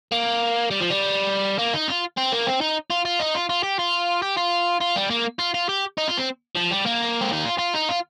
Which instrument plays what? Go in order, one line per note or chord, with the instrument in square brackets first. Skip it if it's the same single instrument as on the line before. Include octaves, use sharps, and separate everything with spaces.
[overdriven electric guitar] A#3
G3
F3
G3
A#3
D#4
F4
C4
A#3
C4
D#4
F4
F4
D#4
F4
F4
G4
F4
G4
F4
F4
G3
A#3
F4
F4
G4
D#4
F4
C4
F3
G3
A#3
C4
D#4
F4
F4
D#4
F4